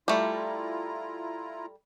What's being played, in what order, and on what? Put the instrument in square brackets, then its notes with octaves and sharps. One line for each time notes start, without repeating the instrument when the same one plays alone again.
[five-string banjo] G3 A3 [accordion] E4 F4 A#5